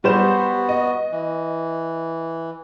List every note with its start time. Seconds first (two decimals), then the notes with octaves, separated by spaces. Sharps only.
0.04 G3 B3 F#4 C5 E7
0.69 D#5
1.11 E3